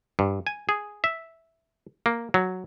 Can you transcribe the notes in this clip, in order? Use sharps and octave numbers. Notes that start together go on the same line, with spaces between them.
G2
G#5
G#4
E5
A#3
F#3